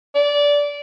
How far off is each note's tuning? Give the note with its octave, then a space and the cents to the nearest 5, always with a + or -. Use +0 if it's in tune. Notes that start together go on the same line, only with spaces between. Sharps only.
D5 -20